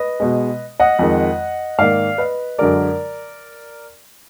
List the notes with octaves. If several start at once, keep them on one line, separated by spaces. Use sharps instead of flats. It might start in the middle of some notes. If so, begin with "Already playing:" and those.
Already playing: B4 D#5
B2 G#3
D#5 F#5
F2 D#3 G#3
G#2 D#3 A#3 D5 F5
B4 D#5
F#2 D3 G#3 A#4 D5